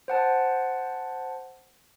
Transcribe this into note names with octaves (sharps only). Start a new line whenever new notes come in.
C5 F#5 A5